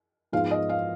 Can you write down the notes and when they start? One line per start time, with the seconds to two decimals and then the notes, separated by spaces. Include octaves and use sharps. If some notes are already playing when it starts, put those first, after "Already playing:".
0.33 G#2 F3 B3 F4 G#4 F5
0.51 D#5
0.69 F5